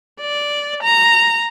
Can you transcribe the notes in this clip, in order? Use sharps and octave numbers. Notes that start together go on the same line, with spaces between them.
D5
A#5